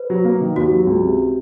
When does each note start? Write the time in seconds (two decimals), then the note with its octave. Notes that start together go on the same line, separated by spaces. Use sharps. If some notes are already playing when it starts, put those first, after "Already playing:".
Already playing: B4 C5
0.10 F#3
0.25 A#3
0.41 D#3
0.56 D#2 F#4
0.71 F#3
0.87 C#2
1.02 C3